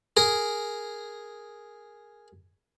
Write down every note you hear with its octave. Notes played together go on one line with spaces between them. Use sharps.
G#4 A#4